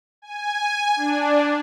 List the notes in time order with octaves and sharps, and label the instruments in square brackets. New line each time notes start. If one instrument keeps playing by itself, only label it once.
[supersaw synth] G#5
D4